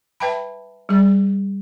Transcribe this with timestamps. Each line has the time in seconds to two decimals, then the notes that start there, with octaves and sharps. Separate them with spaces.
0.20 B4 E5 G5 A5 B5
0.89 G3 G#4